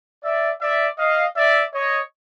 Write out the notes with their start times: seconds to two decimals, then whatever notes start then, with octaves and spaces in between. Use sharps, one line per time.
0.22 D5 E5
0.60 D5 E5
0.98 D#5 F5
1.35 D5 E5
1.72 C#5 D#5